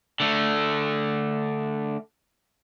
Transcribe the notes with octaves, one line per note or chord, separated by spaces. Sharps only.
D3 A3